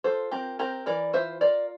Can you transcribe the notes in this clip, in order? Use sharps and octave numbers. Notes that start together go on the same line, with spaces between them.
F4 A4 C5
C4 G4 A#4
C4 G4 A#4
E3 A#4 D5
F4 C5 E5
F4 A#4 D5